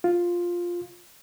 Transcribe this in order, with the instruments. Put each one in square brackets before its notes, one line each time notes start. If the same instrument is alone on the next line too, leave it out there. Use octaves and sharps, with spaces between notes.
[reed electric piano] F4